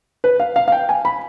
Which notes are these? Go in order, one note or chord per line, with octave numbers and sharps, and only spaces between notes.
B4
F5
F5
F5
G5
G#5
B5